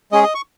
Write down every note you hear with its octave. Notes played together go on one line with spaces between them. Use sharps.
G#3 C#4 G#4 D#5
D#5
C#6